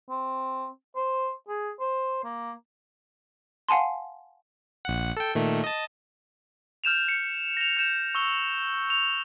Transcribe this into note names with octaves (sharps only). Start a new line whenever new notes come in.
C4
C5
G#4
C5
A#3
F5 F#5 G#5 A5 C6
A#1 F#5
A4 G5
A#2 D#3 A3
D#5 A5
F6 G6 E7 F7
C#7
A#6 F7
G6 E7
C#6 E6 G7
F7